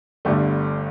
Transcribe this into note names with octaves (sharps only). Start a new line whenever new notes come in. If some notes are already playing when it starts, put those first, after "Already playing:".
G1 G2 D3 A3